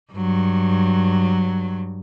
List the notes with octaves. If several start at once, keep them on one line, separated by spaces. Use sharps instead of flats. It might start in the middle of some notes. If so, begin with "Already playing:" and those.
G2 F#3